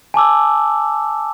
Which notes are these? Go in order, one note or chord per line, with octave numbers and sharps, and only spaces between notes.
G#5 A5 D6 E6